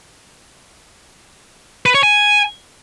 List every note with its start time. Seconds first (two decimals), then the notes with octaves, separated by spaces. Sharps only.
1.86 B4
1.94 C#5
2.03 G#5